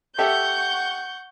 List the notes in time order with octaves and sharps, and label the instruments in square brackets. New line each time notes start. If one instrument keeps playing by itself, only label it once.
[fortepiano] G4 A4 E5 [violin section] F#5 C#6 G6